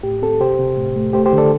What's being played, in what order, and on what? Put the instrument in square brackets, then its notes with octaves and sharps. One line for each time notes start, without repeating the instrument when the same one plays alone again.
[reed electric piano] A2 G4
C4 A4
C3 G4 C5
C3
A2
A3
A3 G4 C5
G4 C5
D3
A4 D5